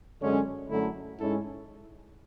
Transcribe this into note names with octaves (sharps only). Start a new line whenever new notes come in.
F#2 D3 G#3 C#4
F#2 D3 F#3 A3 E4
G#2 G#3 C#4 E4 A4